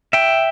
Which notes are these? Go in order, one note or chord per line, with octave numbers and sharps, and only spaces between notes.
E5 G5